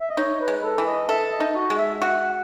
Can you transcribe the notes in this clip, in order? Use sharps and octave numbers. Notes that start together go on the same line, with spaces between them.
E5
D#5
D#4 C#5
B4
G#3
A4
E3
D#5
A4 E5
D#5
D#4
F#4
G#3
E5
F#4 F#5